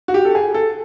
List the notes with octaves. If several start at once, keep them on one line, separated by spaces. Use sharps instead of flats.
F#4
G4
A4
G#4
A4